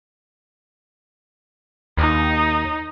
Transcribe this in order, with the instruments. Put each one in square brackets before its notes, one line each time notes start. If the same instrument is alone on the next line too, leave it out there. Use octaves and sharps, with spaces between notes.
[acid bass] D#2 [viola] D#4